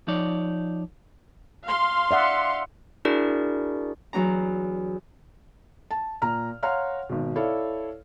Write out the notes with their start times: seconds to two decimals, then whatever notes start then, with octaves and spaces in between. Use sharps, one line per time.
0.08 F3 D#4 C#5 D5
1.65 F5 C6
2.11 D5 E5 F#5
3.05 D4 E4 F#4 G#4 A#4 D5
4.13 E2 F#3 D4 A#5
5.91 A5
6.22 A#2 A#5 F6
6.63 C#5 F5 F#5 A#5 C6 F6
7.09 G#1 B2
7.36 E4 A4 C#5 D5 F5